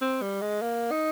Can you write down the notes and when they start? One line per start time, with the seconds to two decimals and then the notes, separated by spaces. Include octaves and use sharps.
0.01 C4
0.22 G3
0.41 G#3
0.62 A#3
0.91 D#4